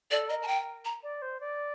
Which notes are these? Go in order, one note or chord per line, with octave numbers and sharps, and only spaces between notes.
A4 D5
A#4 D#5
A5
G5
A#5
D5
C5
D5